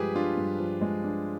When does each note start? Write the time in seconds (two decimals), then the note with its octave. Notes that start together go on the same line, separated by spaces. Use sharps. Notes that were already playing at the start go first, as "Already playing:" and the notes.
Already playing: G2 F3 G#3 G4 G#4 B4
0.15 D4 F4
0.37 G2
0.59 F3
0.81 G#3
1.04 D4